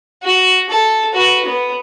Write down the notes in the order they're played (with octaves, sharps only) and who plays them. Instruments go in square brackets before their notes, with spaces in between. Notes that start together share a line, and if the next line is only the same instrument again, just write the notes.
[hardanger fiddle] F#4
A4
F#4 B4
B3